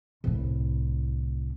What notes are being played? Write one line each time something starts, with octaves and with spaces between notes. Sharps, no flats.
C2 A2